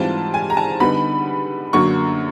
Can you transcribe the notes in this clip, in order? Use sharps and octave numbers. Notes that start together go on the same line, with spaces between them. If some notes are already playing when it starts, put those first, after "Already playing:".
Already playing: G#2 E3 G3 C4 F4 A5
G#5
A#5
A5
D3 G3 B3 D#4 B5
F#2 D3 F#3 A#3 C#6